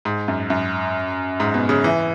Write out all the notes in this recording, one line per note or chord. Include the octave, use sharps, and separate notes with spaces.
G#2
F#2
F#2
G#2
B2
C#3
E3